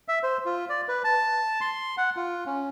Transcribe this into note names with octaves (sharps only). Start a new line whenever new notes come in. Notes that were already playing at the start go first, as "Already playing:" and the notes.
E5
C5
F4
D5
B4
A5
C6
F#5
F4
C#4